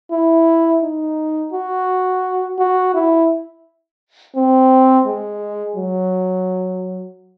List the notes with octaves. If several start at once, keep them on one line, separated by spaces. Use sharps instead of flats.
E4
D#4
F#4
F#4
E4
C4
G#3
F#3